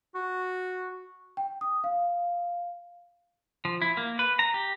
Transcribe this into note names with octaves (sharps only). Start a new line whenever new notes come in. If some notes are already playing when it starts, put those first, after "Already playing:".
F#4
G5
D#6
F5
F3
E4
A#3
B4
A#5
G4